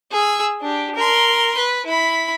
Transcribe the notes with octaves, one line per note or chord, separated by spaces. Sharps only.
G#4 E6
D4 G4
A#4 C6
B4
E4 B5